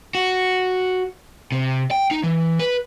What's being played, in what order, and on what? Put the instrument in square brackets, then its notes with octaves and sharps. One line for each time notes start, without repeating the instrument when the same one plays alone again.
[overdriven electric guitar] F#4
C3
G5
D#4
E3
B4